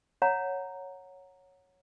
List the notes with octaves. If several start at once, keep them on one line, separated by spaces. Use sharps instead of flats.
C#5 F#5 A#5